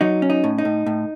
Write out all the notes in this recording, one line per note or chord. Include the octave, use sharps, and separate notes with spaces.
F#3 D#4
C#4
D#4
A2
D#4
A2
A2